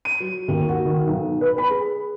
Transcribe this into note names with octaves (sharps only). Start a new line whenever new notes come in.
D#7
F#3
D#2
F#4
D#3
B1
B4
B5
G#4